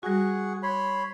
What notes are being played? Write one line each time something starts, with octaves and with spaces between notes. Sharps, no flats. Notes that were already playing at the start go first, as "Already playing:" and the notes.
G3 F#4 G#4 F#5 C#6
C#5 B5 C6